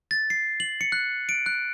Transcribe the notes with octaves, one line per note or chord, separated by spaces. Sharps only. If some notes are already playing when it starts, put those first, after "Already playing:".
A6
C7
F#7
C#7
F#6
D7
F#6